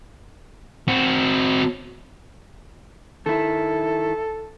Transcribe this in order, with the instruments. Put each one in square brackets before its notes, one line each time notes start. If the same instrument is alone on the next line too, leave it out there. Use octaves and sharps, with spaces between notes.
[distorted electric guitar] C4 F#4
[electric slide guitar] D#3 E4 [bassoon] A4